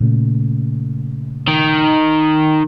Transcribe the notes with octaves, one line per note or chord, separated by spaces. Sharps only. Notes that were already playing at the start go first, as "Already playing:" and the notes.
A#2 C#3 A3
D#3